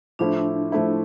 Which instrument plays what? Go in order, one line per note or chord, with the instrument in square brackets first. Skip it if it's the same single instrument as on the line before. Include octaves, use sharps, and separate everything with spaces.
[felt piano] A2 F3 A3 E4 [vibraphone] D4
[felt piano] A2 F3 A3 E4